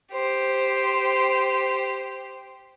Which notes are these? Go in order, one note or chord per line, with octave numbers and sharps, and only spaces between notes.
G4 C5